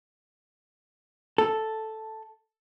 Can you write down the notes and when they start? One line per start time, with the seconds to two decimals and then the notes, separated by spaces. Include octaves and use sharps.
1.38 A4